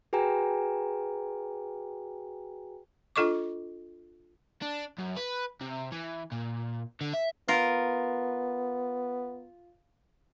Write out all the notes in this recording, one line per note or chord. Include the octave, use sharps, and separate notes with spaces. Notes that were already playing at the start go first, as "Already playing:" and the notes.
F#4 G#4 B4 G5 G#5 A#5
D4 F4 A4 D#5 C#6 D6
D4
F#2
B4
C3
E3
A#2
D3
E5
B3 F4 A#4